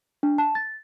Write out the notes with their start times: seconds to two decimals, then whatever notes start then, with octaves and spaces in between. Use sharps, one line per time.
0.23 D4
0.38 A5
0.55 A6